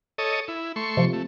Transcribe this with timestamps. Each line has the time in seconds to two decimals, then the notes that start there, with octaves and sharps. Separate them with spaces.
0.18 A4 C#5 D#5
0.48 E4
0.76 A3 C6 C#6
0.97 C3 F3
1.13 A3